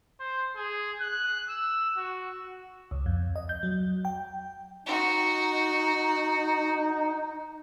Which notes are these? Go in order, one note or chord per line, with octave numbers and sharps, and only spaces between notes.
C5
G#4
F#6
E6
F#4
C#2
F2
D#5
G6
F#3
G5
D#4 F#4